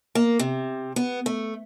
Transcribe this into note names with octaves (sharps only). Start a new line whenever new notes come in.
A#3
C3
B3
A3